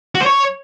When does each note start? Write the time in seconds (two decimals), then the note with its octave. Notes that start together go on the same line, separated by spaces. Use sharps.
0.15 F#4
0.21 C5
0.26 C#5